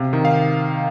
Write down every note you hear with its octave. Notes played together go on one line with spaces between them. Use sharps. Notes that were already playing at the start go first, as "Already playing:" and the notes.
Already playing: C3 F5
D#3
F5